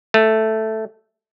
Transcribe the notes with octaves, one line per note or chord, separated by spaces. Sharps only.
A3